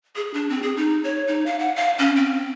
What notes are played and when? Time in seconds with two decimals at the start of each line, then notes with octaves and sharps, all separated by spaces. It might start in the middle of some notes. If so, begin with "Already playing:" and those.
0.16 G#4
0.34 D4
0.50 C4
0.63 G#4
0.77 D#4
1.04 C#5
1.28 D#4
1.46 F5
1.59 F#5
1.76 F5
1.99 C#4
2.16 C4